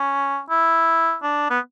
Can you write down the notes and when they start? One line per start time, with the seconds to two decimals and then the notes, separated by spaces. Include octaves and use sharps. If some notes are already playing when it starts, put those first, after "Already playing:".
Already playing: C#4
0.50 E4
1.22 D4
1.50 B3